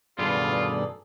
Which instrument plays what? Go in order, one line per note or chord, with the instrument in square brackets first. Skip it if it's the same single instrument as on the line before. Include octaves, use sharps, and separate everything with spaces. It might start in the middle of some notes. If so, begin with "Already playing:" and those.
[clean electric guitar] G2 B2 D#3 [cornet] F4 [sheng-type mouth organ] G#4 A4 D5